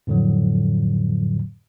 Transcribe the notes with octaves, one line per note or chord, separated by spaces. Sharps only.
F2 A2 D3 F3 F#3